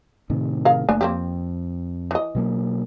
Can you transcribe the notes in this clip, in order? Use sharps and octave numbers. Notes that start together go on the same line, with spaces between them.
A2 C3 D#3
G#4 A#4 F5
F#1 A3 A#3 D4 G#5
F2 A#3 C4 G4
E3 D#5
B2 F#3 A#3